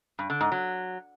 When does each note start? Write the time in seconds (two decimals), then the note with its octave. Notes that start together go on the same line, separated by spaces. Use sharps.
0.19 G2
0.30 D3
0.41 G#2
0.52 F#3